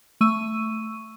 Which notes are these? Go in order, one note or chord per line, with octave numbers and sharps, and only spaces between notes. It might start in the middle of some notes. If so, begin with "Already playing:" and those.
A3 C#6 E6 D#7